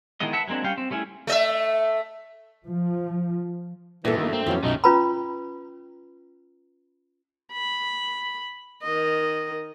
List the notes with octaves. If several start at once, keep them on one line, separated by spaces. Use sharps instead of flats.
D#3 E3 G#3 B3 D#5
B4 E5 F#5 A5 B5
F#3 G#3 A#3 C4 D4
G3 C#4 F5 G5
C4
G3 A3 C#4 E4 G#4
A3 D#5 E5
F3
E2 G2 A#2 E3 F#4 A4
D#3 A3 A#3
A#3 C4
F2 E3 F#3 C#4 F4 G4
B1 F#2 D#3 A3 D#4 A#5
C#4 F4 B4 A#5 B5
B5
D#3 D#5